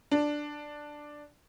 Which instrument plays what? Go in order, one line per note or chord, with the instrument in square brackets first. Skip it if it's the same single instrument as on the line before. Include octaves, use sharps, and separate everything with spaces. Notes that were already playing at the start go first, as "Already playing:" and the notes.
[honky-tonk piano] D4